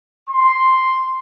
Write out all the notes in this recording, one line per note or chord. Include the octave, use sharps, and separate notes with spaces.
C6